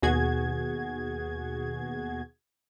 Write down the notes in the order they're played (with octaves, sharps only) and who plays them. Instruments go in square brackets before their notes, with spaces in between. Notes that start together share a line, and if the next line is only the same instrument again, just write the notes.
[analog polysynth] D#2 B2 F#4 G#4 G#6